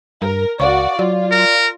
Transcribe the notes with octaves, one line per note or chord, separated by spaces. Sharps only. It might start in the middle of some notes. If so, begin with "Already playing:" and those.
G2 A#4
C#2 F#4 D5 F5 C#6
F#3 F4 D5
A#4